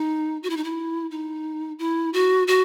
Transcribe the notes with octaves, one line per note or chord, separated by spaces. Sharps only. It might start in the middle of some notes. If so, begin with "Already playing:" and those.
Already playing: D#4
F#4
E4
D#4
E4
D#4
E4
F#4
F#4